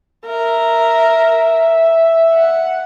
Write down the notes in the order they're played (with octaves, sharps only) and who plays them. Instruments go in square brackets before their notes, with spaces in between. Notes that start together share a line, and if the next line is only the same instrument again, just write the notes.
[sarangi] A#4 [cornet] E5
[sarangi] F#5